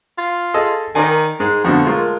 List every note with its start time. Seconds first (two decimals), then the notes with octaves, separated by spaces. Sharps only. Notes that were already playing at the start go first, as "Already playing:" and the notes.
0.18 F4
0.54 G#4 A4 D#5
0.95 D#3 A#4 D5 G#5
1.40 G#2 G#3
1.64 F2 B2 D3 A3
1.85 G#3 F4 A#4